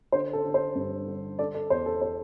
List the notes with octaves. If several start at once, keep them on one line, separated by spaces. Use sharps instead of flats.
D3 C5
A4
D3
C5
G2
D3
D3 A4 D5
A4 D5
E2 C5
A4
C5